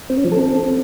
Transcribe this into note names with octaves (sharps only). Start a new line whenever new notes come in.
C4
C#4
F3
A4
C4